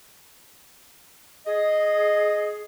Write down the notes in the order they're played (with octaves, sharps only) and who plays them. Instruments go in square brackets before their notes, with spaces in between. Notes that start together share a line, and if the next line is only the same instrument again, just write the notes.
[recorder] G#4 [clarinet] D#5